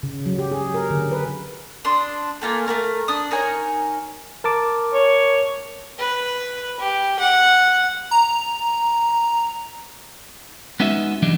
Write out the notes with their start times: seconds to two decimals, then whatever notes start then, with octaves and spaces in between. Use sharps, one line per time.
0.03 C#3
0.26 F#3
0.38 G4
0.52 G#4
0.74 A#4
0.91 D3
1.12 B4
1.85 D4 C6 D#6
2.42 A3 A#3 F4 G#5
2.66 A3 E4 A#4 F6
3.08 D4 D#6
3.31 D#4 A#4 C#5 G#5
4.44 A#4 A5 D6
4.94 C#5
5.99 B4
6.80 G4
7.19 F#5
8.11 A#5
10.80 G#3 B3 C#4 D#4 F#4 E5
11.22 E3 F#3 G3 D4 D#4